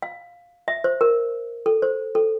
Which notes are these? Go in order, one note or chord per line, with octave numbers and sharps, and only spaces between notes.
F5
E5
C5
A#4
A4
C5
A4